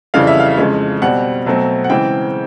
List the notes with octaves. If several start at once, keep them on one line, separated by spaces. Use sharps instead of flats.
F2 C#3 E3 G3 F5
E5
F5
F2 C#3 E3 G#3
B2 G3 C4 F#5
B2 F#3 A3 C4
F#5
C#3 E3 G#3 C4 G5